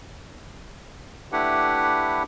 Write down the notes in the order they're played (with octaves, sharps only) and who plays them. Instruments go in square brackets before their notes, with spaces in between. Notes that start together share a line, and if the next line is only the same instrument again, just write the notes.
[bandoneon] A3 D4 E4 G4 B4 F#5